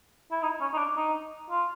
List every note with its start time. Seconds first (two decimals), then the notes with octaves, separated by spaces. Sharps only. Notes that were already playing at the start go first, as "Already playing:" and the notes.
0.31 E4
0.43 D#4
0.61 C#4
0.73 D#4
0.78 D4
0.97 D#4
1.50 F4